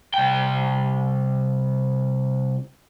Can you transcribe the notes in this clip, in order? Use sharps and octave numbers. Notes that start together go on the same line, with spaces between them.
C2 G5